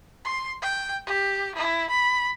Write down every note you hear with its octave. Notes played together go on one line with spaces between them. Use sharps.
C6
G5
G4
E4
B5